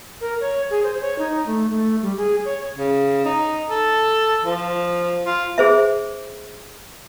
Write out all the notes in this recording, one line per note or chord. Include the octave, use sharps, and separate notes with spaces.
A#4
C#5
G#4
C5
C#5
D#4
A3
A3
G3
G#4
C#5
C#3
D#4
A4
F3
F4
G#4 C5 E5